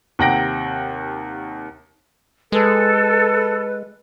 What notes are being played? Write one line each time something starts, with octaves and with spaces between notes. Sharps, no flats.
D#2 C3 F#5 G5 A#6 D7
G#3 A4 B4